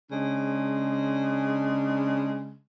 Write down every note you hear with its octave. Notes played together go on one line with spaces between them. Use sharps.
C#3 G#3 D4